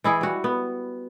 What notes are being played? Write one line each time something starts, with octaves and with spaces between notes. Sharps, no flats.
E3 E4 G#4
G3 F#4
B3